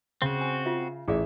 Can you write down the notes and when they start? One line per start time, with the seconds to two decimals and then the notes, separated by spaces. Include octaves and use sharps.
0.22 C#3 C4 F#4
0.41 G#5
0.65 F4 E5
1.08 A1 E4 G#4 D5 E5